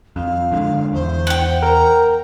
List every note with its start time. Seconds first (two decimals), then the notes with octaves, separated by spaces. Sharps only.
0.16 F2 F5
0.52 G#2 D3
0.93 E2 C5
1.27 F#5 G5
1.62 A#4 A#5